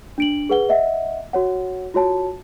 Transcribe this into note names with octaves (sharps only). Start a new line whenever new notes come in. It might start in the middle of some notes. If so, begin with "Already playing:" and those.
D4 D7 F#7
G#4 B4 F#5 G7
D#5 E5 F#5
F#4 C#5 F#5
F4 F#4 C#5 A5